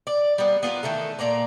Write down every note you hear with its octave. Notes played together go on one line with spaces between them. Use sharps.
D5
G3 A#3 B3
B3 F4 G#4 A#4
D#3 E3 A3 A4
A#2 A#3 D5 A#5